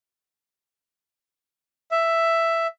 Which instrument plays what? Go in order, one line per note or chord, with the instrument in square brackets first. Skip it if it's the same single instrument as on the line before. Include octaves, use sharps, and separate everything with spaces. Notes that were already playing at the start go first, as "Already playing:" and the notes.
[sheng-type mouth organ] E5